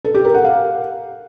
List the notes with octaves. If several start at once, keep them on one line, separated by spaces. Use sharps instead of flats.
A4
G4
A#4
F#5
F5